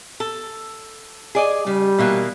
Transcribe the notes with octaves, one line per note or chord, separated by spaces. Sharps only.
A4
G#4 D5 D#5
C#3 G3
B2 E3 A#3